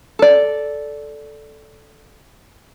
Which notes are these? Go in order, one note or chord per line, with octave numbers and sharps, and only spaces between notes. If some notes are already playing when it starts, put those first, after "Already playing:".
A4 D5